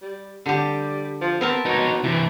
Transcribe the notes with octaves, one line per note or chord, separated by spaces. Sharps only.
G3
D3 G3 G4
F3
B3 C4 A#4 A5
B2 D#4 C#5
C3 E3 E4